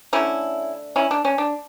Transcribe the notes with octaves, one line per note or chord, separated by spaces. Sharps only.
D3 A3 C#4 E4
C#4 E4
D4
C#4
D4